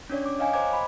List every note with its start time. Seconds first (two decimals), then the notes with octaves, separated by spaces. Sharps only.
0.10 C#4 D4 C#5 D5
0.26 D6
0.39 C#5 D#5 F5 G5 G#5
0.53 C5 D#5 G5 A#5 D6 G#6
0.73 B5